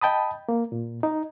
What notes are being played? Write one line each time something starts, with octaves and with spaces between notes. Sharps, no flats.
D#5 G5 A5 B5 D#6
A#3
A#2
D#4